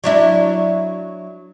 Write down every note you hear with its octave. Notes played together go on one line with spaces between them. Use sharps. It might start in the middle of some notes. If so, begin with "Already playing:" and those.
F#3 D4 E4